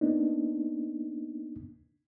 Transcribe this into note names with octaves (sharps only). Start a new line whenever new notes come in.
A#3 B3 D4 D#4